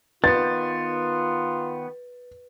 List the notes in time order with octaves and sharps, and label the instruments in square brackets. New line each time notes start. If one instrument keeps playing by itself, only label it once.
[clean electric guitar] D#3 B3 [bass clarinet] F4 [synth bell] B4 [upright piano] A6